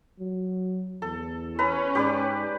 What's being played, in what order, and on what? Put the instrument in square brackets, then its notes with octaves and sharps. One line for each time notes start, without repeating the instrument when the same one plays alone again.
[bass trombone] F#3
[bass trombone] E2 [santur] A4
[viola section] C#4 [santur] B4 A#5
[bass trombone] G#2 [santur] G4 B4 D5